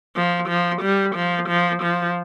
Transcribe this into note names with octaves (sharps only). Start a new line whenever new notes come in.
F3
F3
G3
F3
F3
F3